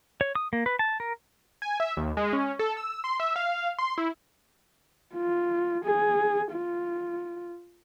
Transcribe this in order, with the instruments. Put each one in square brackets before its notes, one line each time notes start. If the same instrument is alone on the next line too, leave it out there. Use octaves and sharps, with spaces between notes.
[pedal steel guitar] C#5
D#6
A#3
B4
A5
A#4
[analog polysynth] G#5
E5
D#2
G#3
C#4
A4
E6
C6
E5
F5
C6
E4
[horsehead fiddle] F4
G#4
F4